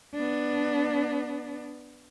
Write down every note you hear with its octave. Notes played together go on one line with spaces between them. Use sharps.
B3 D4